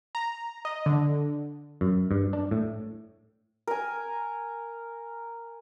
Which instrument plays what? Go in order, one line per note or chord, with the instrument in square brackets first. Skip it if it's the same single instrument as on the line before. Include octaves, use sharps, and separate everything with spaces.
[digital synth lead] A#5
D#5
D3
[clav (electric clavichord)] F#2
G2
D4
A2
[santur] A#4 G#5